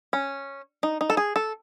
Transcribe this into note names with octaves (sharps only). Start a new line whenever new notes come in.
C#4
D#4
D#4
A4
G#4
A4